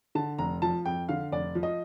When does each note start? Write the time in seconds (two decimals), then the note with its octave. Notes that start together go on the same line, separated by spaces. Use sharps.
0.15 D3 A5
0.39 F1 A#5
0.62 F3 A5
0.85 F2 G5
1.09 D3 F5
1.32 F1 D5
1.55 F3
1.63 D#5